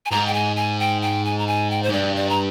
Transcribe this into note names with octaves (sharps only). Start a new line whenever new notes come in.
G#5
G#2 A#5
G5
G#5
G#5
G5
G5
G#5
A#5
G#5
G5
C5
G#2
G2 D5
D5
A#5